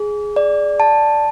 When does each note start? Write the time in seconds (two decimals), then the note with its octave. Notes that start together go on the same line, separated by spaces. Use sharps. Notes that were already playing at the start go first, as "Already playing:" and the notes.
Already playing: G#4
0.36 D5
0.80 A5